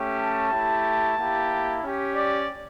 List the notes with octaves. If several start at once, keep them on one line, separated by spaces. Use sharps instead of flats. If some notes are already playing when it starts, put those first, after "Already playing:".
Already playing: A3 C#4 G4
A5
A3 E4 G4
A#3 E4 G4
C#4 G4
D5